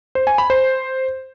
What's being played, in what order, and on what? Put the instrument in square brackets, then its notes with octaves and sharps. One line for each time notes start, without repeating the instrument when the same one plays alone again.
[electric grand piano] C5
G#5
B5
C5